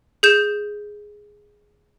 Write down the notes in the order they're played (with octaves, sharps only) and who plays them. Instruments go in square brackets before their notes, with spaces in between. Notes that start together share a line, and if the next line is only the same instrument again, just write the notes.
[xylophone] G#4 G6 E7